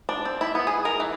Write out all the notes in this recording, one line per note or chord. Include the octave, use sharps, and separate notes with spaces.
D4
C4
E4
B3
G#4
A#4
E3